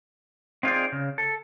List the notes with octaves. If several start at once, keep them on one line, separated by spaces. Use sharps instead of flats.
C4 D#4 F4 G#4 C5 D5
C#3
A4